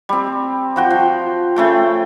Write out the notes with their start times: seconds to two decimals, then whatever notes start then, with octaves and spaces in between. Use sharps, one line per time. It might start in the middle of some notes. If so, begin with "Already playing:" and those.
0.09 G3 C4
0.76 F3 F#4 G5
0.90 F3
1.56 C#3 A3 G5